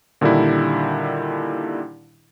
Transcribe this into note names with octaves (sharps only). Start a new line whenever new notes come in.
A#2 D3 D#3 G3 D4 E4